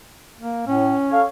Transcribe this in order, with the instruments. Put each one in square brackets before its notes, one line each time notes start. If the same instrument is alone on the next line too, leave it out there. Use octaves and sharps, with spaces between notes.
[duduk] A#3
[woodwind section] A2 [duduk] C#4
[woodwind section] A4 C#5 F5